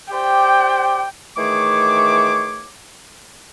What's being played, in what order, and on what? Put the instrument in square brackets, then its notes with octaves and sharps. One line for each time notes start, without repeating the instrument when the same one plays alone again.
[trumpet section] G4 C5 D5 [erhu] G5
[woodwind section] D#3 E3 A3 G#4 C#5 D6